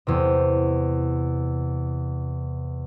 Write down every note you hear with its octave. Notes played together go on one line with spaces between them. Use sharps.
E2 C3